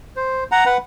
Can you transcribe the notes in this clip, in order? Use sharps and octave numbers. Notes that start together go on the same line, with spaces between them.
C5
F#5 A#5
B4 F#5